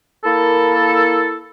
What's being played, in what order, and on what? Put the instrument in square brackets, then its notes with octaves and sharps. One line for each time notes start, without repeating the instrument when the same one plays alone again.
[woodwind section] A#3 E4 A4